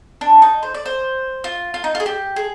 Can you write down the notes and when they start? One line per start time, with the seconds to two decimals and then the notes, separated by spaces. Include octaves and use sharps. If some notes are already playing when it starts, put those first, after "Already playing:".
0.21 D4
0.42 D#4
0.63 C5
0.74 D5
0.86 C5
1.44 F4
1.74 F4
1.84 D#4
1.95 F4
2.00 G#4
2.06 G4
2.36 G#4